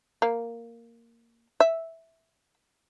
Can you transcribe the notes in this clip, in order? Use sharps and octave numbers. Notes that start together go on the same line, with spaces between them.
A#3
E5